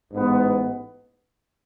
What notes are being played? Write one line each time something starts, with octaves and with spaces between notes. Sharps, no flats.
A1 G#2 G#3 B3